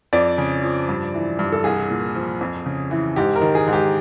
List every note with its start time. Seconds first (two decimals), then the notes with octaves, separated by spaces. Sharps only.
0.13 F2 D5
0.38 C#3
0.63 F3
0.89 G2
1.14 E3
1.39 G2
1.52 A4
1.64 C2 G#4
1.90 A#2
2.15 F3
2.41 F2
2.66 C#3
2.91 E3
3.16 G#2 G4
3.36 A#4
3.41 D#3
3.55 G#4
3.68 G#2
3.73 G4